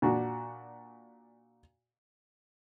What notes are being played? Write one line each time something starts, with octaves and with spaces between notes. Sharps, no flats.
A#2 D4 F#4